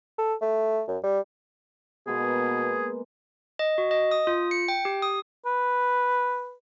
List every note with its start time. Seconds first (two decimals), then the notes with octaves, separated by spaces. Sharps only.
0.19 A4
0.42 A3
0.88 F#2
1.04 G3
2.07 B2 G#3 A#3 B3 G#4
3.59 D#5
3.78 F#4
3.91 D#5
4.11 D#6
4.27 F4
4.51 C#7
4.68 G5
4.85 G4
5.02 D#6
5.46 B4